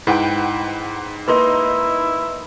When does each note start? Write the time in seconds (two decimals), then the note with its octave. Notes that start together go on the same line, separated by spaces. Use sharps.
0.07 G#2 E4 B4 F#5 G5
1.28 A#3 D#4 E4 B4 C6